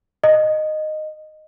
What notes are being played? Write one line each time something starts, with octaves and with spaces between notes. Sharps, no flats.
D#5